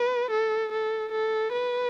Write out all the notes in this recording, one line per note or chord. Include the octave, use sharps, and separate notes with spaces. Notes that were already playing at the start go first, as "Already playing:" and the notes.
Already playing: B4
A4
A4
A4
B4